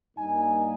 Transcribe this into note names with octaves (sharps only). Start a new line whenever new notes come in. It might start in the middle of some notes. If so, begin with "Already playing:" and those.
G2 G3 A#3 D#4 G#5